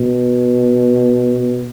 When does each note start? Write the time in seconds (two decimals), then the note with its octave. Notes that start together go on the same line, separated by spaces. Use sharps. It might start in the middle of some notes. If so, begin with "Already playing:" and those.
Already playing: B2